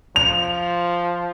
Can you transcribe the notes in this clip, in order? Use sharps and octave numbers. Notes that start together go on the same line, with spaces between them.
F3 F7